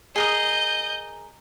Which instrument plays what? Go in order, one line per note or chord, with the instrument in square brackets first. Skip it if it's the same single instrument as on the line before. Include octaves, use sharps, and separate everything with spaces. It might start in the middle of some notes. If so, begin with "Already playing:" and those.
[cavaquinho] G#4 A#4 D#6 [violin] D#5 G6